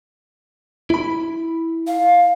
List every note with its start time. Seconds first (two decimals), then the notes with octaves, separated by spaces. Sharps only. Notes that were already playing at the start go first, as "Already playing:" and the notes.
0.90 E4 B5
1.87 F5